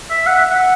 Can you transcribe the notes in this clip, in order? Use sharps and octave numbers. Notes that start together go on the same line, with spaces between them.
E5
F#5
E5
F#5